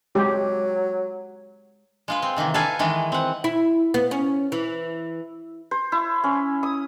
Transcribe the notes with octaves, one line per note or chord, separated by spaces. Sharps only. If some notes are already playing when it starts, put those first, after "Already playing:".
F#3 G#3 G4
G#3 F4 B4
C4
C3 D#3 E3 A#3
A4 B4 E5 F5 G#5
D#3 E3 G#3 E4
C4 F#5
E4
B3
C#4
E3
C5
E4
C#4
D#6